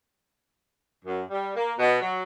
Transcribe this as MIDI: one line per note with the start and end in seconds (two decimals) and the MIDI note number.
1.05 1.21 42
1.30 1.51 55
1.56 1.73 58
1.77 1.97 47
2.01 2.23 54